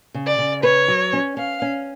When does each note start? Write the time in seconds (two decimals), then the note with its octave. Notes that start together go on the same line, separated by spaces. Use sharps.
0.14 C#3
0.26 D5
0.38 C#3
0.63 B4 C#5
0.88 F#3
1.13 C#4
1.37 C#4 F5
1.62 C#4